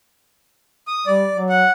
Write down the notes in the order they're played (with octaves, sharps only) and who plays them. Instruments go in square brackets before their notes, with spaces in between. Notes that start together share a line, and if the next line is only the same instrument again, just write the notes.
[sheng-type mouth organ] D#6
[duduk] G3 [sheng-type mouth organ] D5
[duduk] F#3
[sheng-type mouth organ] F#5